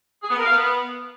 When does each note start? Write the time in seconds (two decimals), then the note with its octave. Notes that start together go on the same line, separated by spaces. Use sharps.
0.23 G#4
0.30 B3
0.37 A#4
0.45 F5
0.52 B3